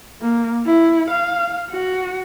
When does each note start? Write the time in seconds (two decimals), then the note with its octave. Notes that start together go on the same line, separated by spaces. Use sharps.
0.21 A#3
0.66 E4
1.10 F5
1.70 F#4